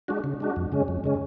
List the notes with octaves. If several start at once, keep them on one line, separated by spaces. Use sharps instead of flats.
G#3 D4 F#4
C#3
G#3 D4 F#4
F2
C#3 G#3 C#4
F2
C#3 G#3 C#4